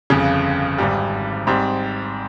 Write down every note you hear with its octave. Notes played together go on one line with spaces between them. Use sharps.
G1 F2 C#3
G#1 G#2 G3
G#2 G3 C4